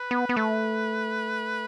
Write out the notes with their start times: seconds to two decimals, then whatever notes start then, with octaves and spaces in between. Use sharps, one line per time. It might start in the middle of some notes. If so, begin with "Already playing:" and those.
Already playing: B4
0.11 B3
0.29 B3
0.37 A3